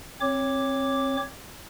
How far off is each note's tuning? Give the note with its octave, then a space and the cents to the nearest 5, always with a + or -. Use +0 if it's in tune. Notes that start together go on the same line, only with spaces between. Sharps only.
C4 +25 C#5 +0 D6 +0